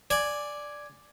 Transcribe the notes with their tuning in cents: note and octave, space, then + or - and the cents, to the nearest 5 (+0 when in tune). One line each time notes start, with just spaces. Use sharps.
D5 +0 G#5 +0